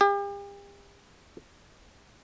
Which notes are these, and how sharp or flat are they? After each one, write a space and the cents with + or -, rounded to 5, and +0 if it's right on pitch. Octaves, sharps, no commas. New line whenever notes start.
G4 +40